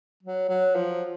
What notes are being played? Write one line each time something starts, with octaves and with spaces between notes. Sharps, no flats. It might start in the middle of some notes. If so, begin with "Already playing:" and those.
F#3
F#3
F3